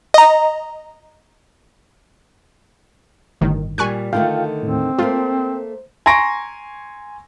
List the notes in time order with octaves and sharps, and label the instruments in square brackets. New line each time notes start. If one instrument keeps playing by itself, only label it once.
[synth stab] D#5 A#5
[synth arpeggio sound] G1 A2 D#3
[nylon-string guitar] A#2 G3 [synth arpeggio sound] G#5 C#6 F#6
[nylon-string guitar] D3 D#3 A3 [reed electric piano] F4 F5 G5
[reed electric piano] D#2 A2 [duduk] C4
[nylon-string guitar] A3 A#3 [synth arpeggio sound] F4 [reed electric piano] C5
[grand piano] G#5 A#5 C6 C#6 A#6 D7